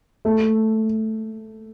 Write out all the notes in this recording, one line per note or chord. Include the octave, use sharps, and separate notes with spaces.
A3